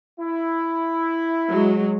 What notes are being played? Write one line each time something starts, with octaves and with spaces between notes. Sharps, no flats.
E4
F#3 G#3